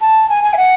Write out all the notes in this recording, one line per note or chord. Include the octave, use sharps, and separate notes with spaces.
A5
G#5
G#5
E5
F#5